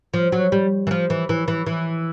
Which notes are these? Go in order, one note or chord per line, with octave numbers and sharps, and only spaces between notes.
F3
F#3
G3
E3
F3
E3
E3
E3
E3